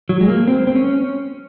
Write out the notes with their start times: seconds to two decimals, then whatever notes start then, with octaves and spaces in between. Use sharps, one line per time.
0.09 F#3
0.21 G#3
0.28 A#3
0.48 C4
0.67 C4
0.75 C#4